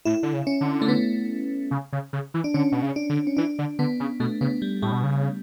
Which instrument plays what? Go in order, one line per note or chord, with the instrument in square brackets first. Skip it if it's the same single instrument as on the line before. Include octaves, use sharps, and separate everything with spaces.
[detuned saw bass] A2 [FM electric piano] E4
[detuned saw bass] D3
C#3
[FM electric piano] C#4
[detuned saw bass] D3
[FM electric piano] A3
B3
[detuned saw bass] C#3
C#3
C#3
E3
[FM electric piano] D4
[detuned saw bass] D3 [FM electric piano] C#4
[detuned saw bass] B2
C#3
[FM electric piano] D4
[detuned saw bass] D3
[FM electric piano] C#4
[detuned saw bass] E3 [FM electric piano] D4
[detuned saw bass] D3
[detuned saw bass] D3 [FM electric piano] B3
[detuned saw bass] C#3
[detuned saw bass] B2 [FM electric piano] A3
[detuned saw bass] C#3 [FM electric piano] B3
[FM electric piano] G3
[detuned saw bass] A2 [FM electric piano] G3
[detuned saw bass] B2
C#3